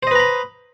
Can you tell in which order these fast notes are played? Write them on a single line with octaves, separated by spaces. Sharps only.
C5 D#5 B4 A#5 B5